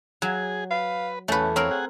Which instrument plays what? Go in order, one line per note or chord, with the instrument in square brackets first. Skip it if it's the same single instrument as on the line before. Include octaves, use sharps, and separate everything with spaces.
[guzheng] F#3 [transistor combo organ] G#4
[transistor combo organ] B4 [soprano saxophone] F5
[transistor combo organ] E2 [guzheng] A3 B4 [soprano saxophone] C#4
[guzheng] C4 A#4 [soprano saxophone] C#5
[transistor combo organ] G#4 F#5